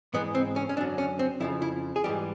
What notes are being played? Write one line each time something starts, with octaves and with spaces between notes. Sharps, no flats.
G#2 E3 G#3 B3
C4
C#4
C#4
F#2 D3 F#3 D4
C#4
C4
F2 C#3 F3 E4
E4
G#4
G#2 E3 G3 G4